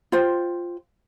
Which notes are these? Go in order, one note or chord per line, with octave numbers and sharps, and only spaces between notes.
F4 C5 G5